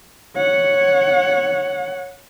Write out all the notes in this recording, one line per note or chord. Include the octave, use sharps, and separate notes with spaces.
C#5 F#5